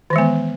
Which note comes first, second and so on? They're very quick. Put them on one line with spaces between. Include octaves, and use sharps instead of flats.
D#3 E3 G#3 B3